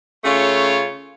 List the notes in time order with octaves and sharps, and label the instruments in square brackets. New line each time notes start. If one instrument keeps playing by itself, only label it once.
[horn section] C#3 A3 F4 C#5